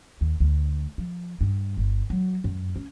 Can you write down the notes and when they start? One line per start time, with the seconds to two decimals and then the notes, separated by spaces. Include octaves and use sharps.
0.21 D#2
0.40 D2
0.98 F3
1.41 G2
1.77 G1
2.10 F#3
2.44 F#2
2.76 C#4